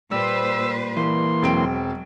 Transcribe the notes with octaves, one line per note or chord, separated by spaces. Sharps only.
A#2 G3 B4 C5 E6
E3 A#3 C6
E1 F#3 C4 D7